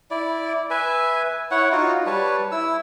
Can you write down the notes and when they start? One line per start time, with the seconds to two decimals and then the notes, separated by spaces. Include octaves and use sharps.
0.11 E4 D5
0.70 B4 E5 G#5
1.51 E4 C#5 F#5
1.72 D#4 F4 F#4
2.06 G3 B4 C#5 A5
2.52 E4 E6